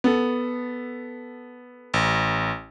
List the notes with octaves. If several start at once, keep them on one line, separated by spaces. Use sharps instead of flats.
B3 A4
A1